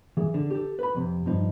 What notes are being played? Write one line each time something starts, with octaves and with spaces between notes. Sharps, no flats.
E3 G#4
D3
G4 A4
B4 B5
F2 C3
G2 F3 D#4